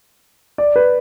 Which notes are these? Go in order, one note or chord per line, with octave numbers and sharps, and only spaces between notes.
D5
B4